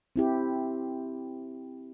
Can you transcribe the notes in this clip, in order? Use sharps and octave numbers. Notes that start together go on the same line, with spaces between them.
C4 E4 G4